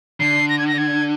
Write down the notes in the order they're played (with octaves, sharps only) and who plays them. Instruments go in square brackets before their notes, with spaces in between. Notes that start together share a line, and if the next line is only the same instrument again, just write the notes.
[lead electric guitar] D3 [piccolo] C7
[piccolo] A#6
G#6
A#6
G#6